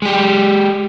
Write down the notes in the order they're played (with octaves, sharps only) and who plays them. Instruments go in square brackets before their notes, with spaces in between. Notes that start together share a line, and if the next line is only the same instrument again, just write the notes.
[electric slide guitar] G#3 G4